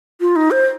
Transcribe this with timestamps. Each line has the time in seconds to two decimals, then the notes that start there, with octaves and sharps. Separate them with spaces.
0.21 F4
0.36 D#4
0.51 C5